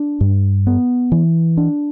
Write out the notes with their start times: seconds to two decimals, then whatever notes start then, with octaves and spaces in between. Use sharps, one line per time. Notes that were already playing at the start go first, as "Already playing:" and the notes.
Already playing: D4
0.21 G2
0.67 B3
1.12 E3
1.57 D4